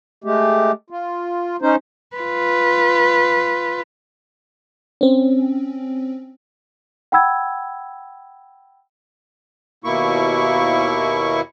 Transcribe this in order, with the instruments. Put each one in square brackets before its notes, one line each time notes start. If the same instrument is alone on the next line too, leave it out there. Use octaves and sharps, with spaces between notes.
[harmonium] G#3 A3 G4
F4
C#4 D#4 C5
[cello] F4 B4
[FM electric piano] C4 C#4
[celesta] F#5 G5 B5 E6 G#6
[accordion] D#2 B2 A#3 E4 C#6